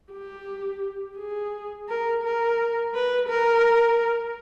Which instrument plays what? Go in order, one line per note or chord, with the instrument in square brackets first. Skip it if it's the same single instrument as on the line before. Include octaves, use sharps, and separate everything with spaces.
[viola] G4
G#4
A#4
A#4
B4
A#4